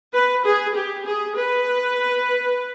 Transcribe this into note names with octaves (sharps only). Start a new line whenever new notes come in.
B4
G#4
G4
G#4
B4